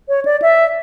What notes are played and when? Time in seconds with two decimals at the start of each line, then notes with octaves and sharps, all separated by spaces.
0.09 C#5
0.25 D5
0.42 E5